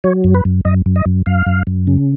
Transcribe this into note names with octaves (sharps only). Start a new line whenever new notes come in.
F#3 C#5
F#2
B4
F#2
F#2 D#5
F#2
D#5
F#2
F#2 F5
F#2
F#2
C#3